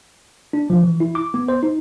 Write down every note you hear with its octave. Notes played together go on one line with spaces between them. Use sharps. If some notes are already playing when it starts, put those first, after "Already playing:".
D4
F3
E3
E4
D6
B3
C5
D#4